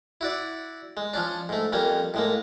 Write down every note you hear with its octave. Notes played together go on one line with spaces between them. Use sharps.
E4 F#4 D5
G#3
F3 C#4 D4
G#2 A3
F2 G3 A#3 C#4
A2 G#3 A#3